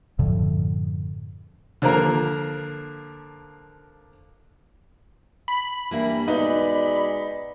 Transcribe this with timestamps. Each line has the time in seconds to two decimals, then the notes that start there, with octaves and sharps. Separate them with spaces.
0.19 F#2 A2 D3 F3
1.82 D3 F3 A#3 A#4
5.48 B5
5.91 E3 G3 A#3 D4 E5
6.28 B2 G#3 B3 D#4 B4 D5